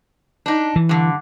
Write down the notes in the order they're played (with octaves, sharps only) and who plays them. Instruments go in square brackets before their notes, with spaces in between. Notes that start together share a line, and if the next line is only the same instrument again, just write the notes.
[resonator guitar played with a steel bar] D4 D#4
[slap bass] E3
[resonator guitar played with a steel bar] G2 D3